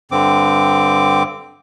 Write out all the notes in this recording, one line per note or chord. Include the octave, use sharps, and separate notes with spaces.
G2 D3 C4 D6